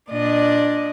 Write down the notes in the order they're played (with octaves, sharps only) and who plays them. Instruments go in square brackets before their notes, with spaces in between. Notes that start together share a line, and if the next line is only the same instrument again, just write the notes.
[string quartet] A#2 D4 D5 D#5